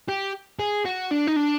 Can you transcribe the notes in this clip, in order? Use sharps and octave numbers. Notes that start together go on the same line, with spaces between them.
G4
G#4
F#4
D4
D#4
D4